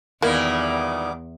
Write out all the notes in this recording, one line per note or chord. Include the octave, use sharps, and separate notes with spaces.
E2 A#2 D#3 G3 A#3 B3 E4 D6